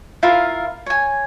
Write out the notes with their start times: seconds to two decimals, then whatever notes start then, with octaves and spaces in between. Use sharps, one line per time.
0.23 E4 F4 A#4 F5
0.86 C#5 G#5